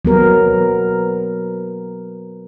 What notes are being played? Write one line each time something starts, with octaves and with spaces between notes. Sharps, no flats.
F#3 B3 A#4